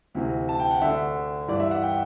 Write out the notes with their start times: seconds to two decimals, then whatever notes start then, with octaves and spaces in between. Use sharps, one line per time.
0.15 D2 C3 E3
0.49 A5
0.60 G5
0.71 F#5
0.82 D2 D3 E5
1.48 G2 E3 D5
1.60 E5
1.71 F#5
1.83 G5